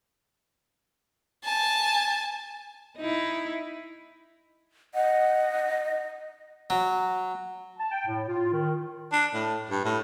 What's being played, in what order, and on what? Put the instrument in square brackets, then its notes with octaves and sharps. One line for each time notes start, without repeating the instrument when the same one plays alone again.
[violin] G#5 A5
[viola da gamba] D#4 E4
[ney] D#5 [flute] F#5
[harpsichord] F#3
[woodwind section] A5
G5
A2
F4
D#3
[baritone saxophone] D4
A2
G2
A2